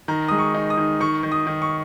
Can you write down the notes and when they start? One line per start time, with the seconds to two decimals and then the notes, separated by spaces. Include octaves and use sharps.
0.08 D#3 A#5
0.28 G#3 D#6
0.39 C#6
0.55 D#4
0.70 D#6
0.77 D#3
1.00 D#3 C#6
1.23 D#3
1.32 D#6
1.47 D#3
1.62 C#6